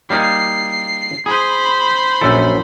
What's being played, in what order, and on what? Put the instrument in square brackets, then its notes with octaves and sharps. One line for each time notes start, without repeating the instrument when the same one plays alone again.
[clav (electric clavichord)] G3 A#3 D#4 [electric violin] C7
[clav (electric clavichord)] G#4 [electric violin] C5 B5
[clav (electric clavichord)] A#1 F#2 A4